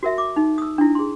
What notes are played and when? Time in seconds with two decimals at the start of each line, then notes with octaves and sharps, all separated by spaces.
0.03 F#4 A#4 E5
0.18 D6
0.36 D#4
0.58 D#6 E6
0.78 D4 E4
0.95 G#4 C6